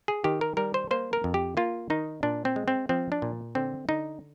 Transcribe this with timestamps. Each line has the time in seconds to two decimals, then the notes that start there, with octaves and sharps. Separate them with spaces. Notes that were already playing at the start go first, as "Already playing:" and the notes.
0.08 G#4
0.24 D#3 G4
0.41 A#4
0.57 G3 A#4
0.74 C5
0.91 A#3 C5
1.13 A#4
1.24 F2
1.34 G4
1.57 A#3 F4
1.90 D#3 D#4
2.23 A#2 D4
2.45 C4
2.56 G#3
2.68 C4
2.89 F3 C4
3.12 D4
3.22 A#2
3.55 D3 C4
3.89 D3 D#4